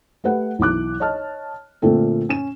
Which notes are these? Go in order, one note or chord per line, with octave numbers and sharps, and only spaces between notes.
A3 G4 B4 F#5
B1 E3 E4 D6 F#6
C#5 D#5 A5 F6
A#2 D3 A3 C4 A4
C#4 E7